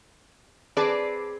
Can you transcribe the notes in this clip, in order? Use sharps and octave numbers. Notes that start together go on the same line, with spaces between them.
C4 G#4 B4 D5 A5 D6